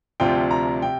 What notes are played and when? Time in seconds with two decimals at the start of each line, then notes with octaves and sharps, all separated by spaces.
0.20 D2 C3 F3 D4 F4 G5
0.51 A#5
0.82 C3 G5